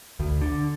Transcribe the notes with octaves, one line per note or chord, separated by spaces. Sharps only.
D2
D3